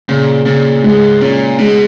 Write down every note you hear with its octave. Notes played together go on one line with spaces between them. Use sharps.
A#2 C#3
A#2 C#3
G#2 G#3
A#2 C#4
B2 G#3